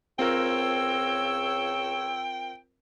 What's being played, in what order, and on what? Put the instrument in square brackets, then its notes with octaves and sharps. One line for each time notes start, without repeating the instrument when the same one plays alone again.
[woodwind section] C#2 C#5 E6 [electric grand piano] C4 F4 A#4 [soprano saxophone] G5